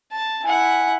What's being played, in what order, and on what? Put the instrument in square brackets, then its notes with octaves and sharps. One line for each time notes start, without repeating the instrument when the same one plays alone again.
[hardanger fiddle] A5
[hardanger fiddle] E4 F#5 [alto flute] G#5